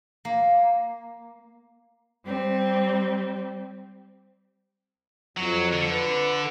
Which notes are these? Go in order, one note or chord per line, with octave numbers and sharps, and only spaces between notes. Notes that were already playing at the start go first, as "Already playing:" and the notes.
A#3
G3 C4
F2 F#3
D3
B4